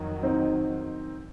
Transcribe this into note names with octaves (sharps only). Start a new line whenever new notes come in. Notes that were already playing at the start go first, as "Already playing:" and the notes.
Already playing: F2 D#3 F#3
C4 D#4